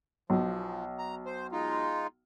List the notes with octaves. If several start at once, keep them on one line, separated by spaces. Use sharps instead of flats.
B1 F3
A#5
C5
G#3 D#4 F4